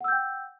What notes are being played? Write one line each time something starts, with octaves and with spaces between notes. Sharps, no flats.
F#5 G5 E6 G6